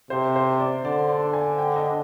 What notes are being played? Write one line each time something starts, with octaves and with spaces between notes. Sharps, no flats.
C3 C5
C5
D5
D3 D5
D5
G#5
G5
D#5